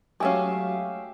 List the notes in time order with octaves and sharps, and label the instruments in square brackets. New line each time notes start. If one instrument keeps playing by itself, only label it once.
[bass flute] F#3 [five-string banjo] G#3 A3 C#4 [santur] G4 E5 F5